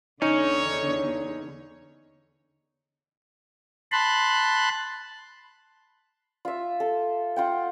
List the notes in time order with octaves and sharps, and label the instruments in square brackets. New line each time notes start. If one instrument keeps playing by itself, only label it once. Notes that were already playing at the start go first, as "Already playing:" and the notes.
[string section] E2 D3 [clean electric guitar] C#4 [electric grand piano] D#4 [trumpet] C#5
[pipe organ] A5 B5 C6 F#6
[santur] F4 E5
A4
F4 F#5 G5